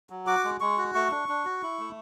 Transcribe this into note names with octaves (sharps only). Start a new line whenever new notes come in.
F#3
F#4 D6
G#3
G#3 C#6
F#4
A3 C#6
D4
D4
F#4
E4
A3